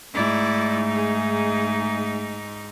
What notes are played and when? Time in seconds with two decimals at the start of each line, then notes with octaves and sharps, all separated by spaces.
0.14 G#2 A3 D#4 E4 D5
0.94 G#4